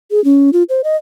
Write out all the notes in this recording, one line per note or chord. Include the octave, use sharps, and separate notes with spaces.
G#4
C#4
F4
C5
D#5